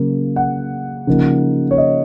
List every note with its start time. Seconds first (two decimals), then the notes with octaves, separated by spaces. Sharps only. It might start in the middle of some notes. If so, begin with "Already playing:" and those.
Already playing: C#3 F#3 A#3
0.36 F#5
1.07 C#3 F3 A#3 D#4
1.71 C#5
1.78 D#5